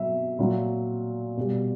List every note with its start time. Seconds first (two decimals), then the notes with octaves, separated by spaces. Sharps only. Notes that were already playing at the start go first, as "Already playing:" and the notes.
Already playing: B2 F#3 E5
0.39 A#2 F#3
1.37 B2 G3